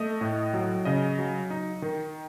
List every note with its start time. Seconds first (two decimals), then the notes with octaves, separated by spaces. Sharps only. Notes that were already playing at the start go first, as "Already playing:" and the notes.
Already playing: A3 D#5
0.21 A2
0.54 F#3
0.85 C#3 D#5
1.18 F#3
1.50 D#4
1.82 D#3